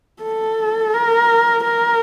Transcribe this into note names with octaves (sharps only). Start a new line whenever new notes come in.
A4
A#4
A#4